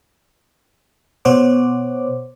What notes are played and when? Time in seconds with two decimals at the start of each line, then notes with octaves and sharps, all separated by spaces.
1.25 B2 B3 C5 C#5 F#5 D6